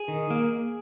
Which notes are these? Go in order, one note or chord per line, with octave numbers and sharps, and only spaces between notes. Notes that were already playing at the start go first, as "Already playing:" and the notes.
Already playing: G#4
D#3
A#3